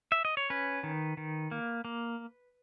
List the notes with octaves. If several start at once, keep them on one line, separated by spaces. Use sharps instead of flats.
E5
D#5
C#5
C#4 B4
D#3
D#3
A#3
A#3